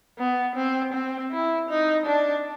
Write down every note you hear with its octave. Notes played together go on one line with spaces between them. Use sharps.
B3
C4
C4
E4
D#4
D4